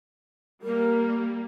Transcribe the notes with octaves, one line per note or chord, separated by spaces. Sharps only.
G3 A#3 A#4